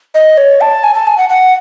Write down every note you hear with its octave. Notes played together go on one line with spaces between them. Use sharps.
D#5
C#5
A5
G#5
A5
G#5
F#5
F#5